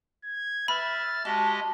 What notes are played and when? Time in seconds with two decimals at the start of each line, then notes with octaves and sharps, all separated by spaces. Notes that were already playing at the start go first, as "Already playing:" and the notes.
0.24 G#6
0.68 B4 E5 B5 F6 A6
1.25 G#3 F#4 G4 D#5 A5